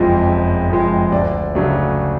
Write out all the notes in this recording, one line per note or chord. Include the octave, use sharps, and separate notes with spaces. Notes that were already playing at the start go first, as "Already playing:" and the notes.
Already playing: F#1 F2 F3 G#3
F#1
F2 F3 G#3
D2 D5
C#3 F#3 A3 D4